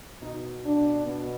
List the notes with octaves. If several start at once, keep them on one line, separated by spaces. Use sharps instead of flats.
B2 D#4
D4
B2